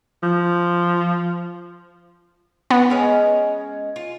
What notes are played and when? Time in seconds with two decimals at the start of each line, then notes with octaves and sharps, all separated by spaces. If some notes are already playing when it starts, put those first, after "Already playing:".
0.23 F3
2.71 B3
2.90 G#3 C#4 D#5
3.96 F4